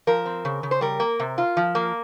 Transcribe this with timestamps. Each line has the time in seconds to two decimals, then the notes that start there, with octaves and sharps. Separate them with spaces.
0.07 F3 A#4
0.25 C4
0.45 C#3
0.63 C#3
0.71 C5
0.81 G3 A#4
1.00 A#3
1.20 C3
1.38 F4
1.57 F3
1.75 A#3